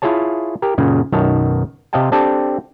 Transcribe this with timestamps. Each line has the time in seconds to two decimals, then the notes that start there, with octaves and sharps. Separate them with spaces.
0.02 E4 F4 G#4 C#5 A5
0.62 G4 A#4
0.78 F#2 A#2 C#3
1.12 B1 F#2 D#3 C#5 A5
1.93 C3 C5 D#5 F5 G5 A5
2.12 C4 D4 G4 A4 A5